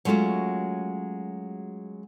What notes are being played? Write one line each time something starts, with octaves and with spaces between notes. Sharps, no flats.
F#3 G#3 A3 C#4 F4 F#4